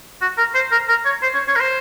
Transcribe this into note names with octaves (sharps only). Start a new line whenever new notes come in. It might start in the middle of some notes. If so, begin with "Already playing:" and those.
F#4
A#4
C5
A#4
A#4
C#5
C5
C#5
C#5
A#4
C5